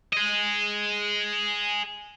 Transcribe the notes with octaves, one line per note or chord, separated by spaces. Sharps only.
G#4 D#5